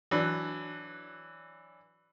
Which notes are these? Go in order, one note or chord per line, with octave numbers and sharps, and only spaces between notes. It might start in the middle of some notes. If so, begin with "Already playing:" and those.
E3 F#3 D4